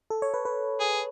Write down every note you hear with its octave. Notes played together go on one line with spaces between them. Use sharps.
A4
C#5
B4
B4
G#4